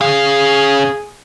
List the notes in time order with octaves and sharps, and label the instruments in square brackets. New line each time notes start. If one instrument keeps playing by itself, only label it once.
[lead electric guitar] C#4 F5 [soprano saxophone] G#4